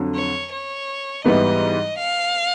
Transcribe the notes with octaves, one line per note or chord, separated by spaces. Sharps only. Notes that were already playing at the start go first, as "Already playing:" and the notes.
Already playing: F2 D3 F#3
C#5
C#5
G#2 E3 G3 B3 D#4 D#5
F5